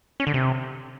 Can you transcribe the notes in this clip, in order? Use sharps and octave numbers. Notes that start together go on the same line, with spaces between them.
C#4
D3
C3